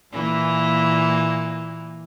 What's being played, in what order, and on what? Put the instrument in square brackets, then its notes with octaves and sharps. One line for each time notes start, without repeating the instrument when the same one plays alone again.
[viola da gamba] A#2 E3 A#3